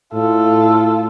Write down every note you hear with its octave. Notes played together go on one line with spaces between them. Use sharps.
A2 F4 A4